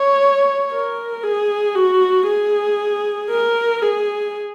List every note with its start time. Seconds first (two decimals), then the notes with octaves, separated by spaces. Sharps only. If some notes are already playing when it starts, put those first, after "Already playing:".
Already playing: C#5
0.72 A#4
1.23 G#4
1.75 F#4
2.28 G#4
3.31 A#4
3.83 G#4